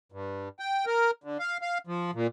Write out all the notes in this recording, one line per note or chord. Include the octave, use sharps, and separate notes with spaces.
G2
G5
A#4
D3
F5
F5
F3
A#2